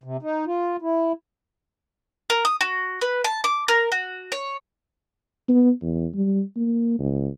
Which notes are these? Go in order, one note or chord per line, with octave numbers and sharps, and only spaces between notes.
C3
D#4
F4
E4
A#4
D#6
F#4
B4
A5
D6
A#4
F#4
C#5
B3
E2
G3
A#3
C#2